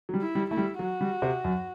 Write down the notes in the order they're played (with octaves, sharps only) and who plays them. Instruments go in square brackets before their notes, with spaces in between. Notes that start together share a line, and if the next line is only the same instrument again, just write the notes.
[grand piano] F#3
G3
[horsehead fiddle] E4
[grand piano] G3
[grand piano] A3 [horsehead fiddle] E4
[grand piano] G3
[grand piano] F#3 [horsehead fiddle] F#4
[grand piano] G3
C3
F#2